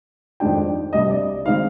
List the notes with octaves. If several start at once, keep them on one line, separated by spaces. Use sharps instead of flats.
F2 D#3 G#3 D4 G5
C2 C3 G3 D4 D#5
D5
D#3 G#3 C4 D#4 F5